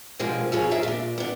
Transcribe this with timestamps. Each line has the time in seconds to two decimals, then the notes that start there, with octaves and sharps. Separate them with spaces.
0.19 B2 D3 F3 G3 G#3 A#3
0.52 F2 F3 G#4 C#5
0.71 G#4 A#4 E5 A5
0.83 A#2 D4
1.18 B3 D4